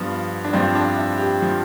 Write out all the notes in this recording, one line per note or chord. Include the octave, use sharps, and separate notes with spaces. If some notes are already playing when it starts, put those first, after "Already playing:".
Already playing: G2 F3 B3
D4
G2 F3 C4
D4
E4
G4
F3